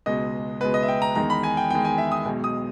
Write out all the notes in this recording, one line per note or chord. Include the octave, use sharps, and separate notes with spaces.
C#2 B2 G#3 D#5
C#2 B2 G#3 B4
D#5
E5
G5
A#5
E2 D#3 G#3 A#5
B5
G#5
G5
E2 D#3 G#3 G5
G#5
E5
D#6
B1 B2 G#3
D#6